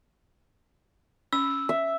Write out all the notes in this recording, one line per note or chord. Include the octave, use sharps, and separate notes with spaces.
C#4 E6
E5